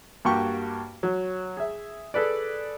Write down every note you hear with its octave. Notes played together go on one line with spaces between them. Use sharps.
G2 A#3 F#4 G4 G5 C#6
F#3
G#4 E5
G#4 A4 B4 D5